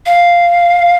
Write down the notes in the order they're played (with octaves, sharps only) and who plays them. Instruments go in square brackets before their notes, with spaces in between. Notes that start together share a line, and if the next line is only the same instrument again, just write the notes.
[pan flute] F5